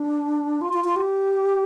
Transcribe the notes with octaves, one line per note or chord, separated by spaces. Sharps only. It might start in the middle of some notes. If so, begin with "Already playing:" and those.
Already playing: D4
F4
F4
F4
G4